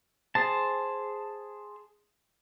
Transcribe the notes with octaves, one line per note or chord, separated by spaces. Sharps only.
G#4 C5 A5